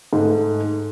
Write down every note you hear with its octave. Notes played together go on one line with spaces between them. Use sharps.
G#2 A3